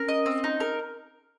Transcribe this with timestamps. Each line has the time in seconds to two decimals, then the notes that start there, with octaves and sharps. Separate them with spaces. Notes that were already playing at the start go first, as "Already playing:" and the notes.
Already playing: C#4 A#4
0.08 D#5
0.26 C4
0.44 D#4
0.60 A#4